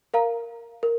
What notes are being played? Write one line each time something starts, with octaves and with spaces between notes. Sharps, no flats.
A#4 F5 A#5
A#4